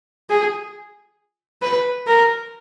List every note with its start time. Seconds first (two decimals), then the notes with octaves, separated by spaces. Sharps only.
0.30 G#4
1.62 B4
2.07 A#4